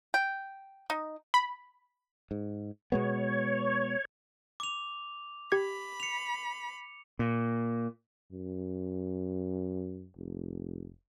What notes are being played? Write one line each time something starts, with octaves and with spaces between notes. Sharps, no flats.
G5
D#4
B5
G#2
B2 G#3 B3 C#5
D6 F7
G4 B5 G#6
C#7 F7
A#2
F#2
F1